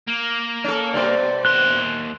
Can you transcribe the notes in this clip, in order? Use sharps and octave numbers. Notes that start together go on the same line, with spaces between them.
A#3
C#4 A4
G2 B2 C5 D5
D#2 C6 F#6